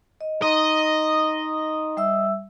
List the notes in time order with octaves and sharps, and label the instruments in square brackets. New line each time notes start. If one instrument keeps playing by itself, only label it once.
[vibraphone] D#5
[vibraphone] D#4 A#5 C6 [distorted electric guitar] D#5
[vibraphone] G3 E5 E6